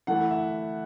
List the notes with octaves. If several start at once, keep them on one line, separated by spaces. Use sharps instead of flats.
E3 A3 E4 F#5
E5